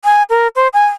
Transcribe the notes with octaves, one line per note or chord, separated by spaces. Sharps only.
G#5
A#4
C5
G#5